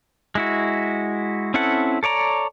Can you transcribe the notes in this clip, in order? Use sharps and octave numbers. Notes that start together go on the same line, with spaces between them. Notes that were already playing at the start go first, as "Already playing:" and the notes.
G#3 E4 F#4
C4 C#4 E4 A4 F#5
A4 C#5 D5 A#5